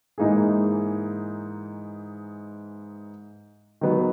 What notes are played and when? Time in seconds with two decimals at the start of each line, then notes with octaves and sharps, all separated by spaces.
0.18 G#2 E3 A#3 D#4 G#4
3.81 D#3 F#3 B3